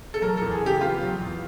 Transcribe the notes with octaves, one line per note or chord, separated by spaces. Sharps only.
A4
F#3 A#4
E2 A4
G#4
C#3 G4
B3 F4
F#3
E2